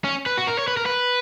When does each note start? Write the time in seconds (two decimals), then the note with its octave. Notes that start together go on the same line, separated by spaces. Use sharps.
0.04 C#4
0.26 B4
0.38 F#4
0.47 A#4
0.59 C#5
0.68 B4
0.77 A#4
0.86 B4